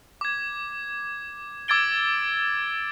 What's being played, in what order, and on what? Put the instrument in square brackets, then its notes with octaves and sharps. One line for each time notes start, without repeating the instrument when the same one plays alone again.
[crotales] D6 G#6
D6 E6 G#6 A6 D7 G7